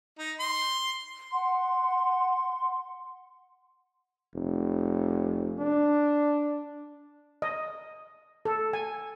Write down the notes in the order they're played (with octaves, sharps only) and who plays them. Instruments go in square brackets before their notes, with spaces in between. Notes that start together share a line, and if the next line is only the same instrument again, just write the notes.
[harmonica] D#4
C6
[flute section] F#5 C6
[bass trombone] F1
D4
[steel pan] D#5
A4
G#5